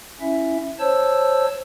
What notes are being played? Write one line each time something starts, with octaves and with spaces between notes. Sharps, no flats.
C#4 E4 E5
C5 C#5 A5 E6